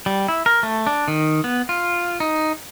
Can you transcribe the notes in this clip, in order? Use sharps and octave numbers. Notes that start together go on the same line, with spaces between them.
G3
E4
A#4
A3
D4
D#3
B3
F4
D#4